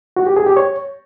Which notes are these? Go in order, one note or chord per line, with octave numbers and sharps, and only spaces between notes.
F#4
G4
G#4
G4
C#5